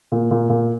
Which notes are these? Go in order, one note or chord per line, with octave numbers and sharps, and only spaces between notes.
A#2
A#2
A#2